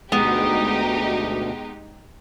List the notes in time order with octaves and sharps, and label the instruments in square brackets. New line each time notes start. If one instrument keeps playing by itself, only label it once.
[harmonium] D2 B2 [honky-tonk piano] G#3 F#5 [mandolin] B3 [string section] D#4 G4